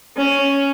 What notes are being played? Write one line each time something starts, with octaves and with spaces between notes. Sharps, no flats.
C#4